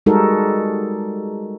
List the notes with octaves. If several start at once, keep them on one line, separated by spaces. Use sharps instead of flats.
G3 G#3 D#4 F#4 A4 A#4